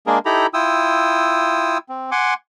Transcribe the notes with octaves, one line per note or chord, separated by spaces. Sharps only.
G#3 A#3 D4 G#4 A#4
D#4 E4 G4 A4 A#5 B5
E4 F4 G5 D#6 E6
C4
F#5 G#5 C6 D6